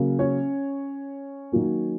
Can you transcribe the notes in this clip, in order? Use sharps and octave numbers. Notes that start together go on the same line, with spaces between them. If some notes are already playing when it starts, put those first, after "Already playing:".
Already playing: C#3 F#3 A#3
C#4 C#5
D#3 F#3 A#3